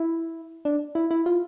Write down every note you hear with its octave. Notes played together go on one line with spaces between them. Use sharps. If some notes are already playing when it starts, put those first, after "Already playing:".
Already playing: E4
D4
E4
E4
F4